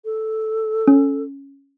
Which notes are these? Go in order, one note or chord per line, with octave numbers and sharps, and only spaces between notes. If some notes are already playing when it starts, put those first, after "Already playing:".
A4
C#4